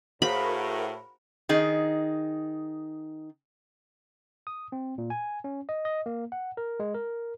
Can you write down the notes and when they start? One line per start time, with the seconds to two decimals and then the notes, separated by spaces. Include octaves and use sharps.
0.22 A2 F#4 G#4 A#4 C5 F5 B5
1.49 D#3 D#4 G#4
4.47 D#6
4.72 C4
4.98 A#2
5.10 G#5
5.44 C#4
5.69 D#5
5.85 D#5
6.06 A#3
6.32 F#5
6.57 A#4
6.80 G#3
6.95 A#4